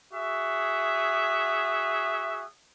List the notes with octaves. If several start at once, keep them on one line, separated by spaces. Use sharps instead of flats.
F#4 G#4 E5